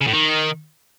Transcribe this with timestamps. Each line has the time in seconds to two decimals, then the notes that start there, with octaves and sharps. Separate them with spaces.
0.01 C#3
0.07 A2
0.13 D#3